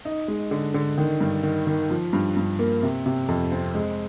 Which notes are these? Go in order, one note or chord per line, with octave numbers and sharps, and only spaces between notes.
D#4
G#3
D3
D3
D#3
G2
D#3
D#3
F3
G2
G2
A#3
C3
C3
F2
C4
G#3